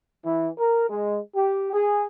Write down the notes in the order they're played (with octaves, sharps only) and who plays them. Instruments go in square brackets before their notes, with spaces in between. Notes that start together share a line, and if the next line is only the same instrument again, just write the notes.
[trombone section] E3
A#4
G#3
G4
G#4